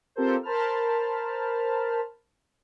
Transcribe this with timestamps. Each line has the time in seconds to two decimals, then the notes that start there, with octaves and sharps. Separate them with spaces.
0.16 C4 F4 G4 A4 A#4 C5
0.43 A#4 C5 A5 B5 F6